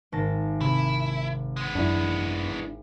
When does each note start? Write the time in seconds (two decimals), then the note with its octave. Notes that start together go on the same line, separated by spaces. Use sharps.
0.12 G#1 A5 A#6
0.61 C3 E4
1.57 G#3 B3
1.75 F#2 D4 E4